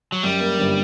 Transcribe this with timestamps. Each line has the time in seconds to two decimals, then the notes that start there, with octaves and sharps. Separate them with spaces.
0.12 F#3
0.23 F#2 G3
0.40 A#3
0.59 G1